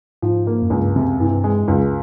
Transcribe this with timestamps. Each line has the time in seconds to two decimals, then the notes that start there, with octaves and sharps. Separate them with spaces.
0.22 G#2 F3
0.47 A#3
0.62 F#2
0.70 C#2 G2
0.95 F#2 C3
1.20 G2 E3
1.44 G#3
1.68 C#2 F#2